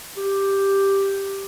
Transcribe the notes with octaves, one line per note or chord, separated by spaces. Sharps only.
G4